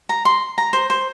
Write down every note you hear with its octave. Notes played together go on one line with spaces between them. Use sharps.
A#5
C6
A#5
C5
C5